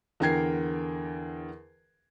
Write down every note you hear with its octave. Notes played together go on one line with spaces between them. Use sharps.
E2 D3 A#4 G5 G#6 C7